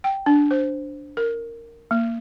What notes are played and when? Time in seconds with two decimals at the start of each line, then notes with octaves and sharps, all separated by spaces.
0.04 G5
0.26 D4
0.51 C5
1.17 A#4
1.91 A#3